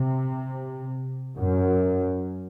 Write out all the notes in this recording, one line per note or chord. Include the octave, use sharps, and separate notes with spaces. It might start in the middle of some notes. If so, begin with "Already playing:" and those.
Already playing: C3
F#2